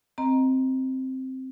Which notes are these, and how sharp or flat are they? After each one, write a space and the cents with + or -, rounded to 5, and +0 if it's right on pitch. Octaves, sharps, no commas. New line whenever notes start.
C4 +0 D#5 +10 A#5 +10